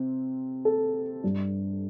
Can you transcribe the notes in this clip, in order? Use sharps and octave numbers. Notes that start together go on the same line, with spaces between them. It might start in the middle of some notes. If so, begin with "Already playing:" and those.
Already playing: C3 C4
A4
G2 G3 D4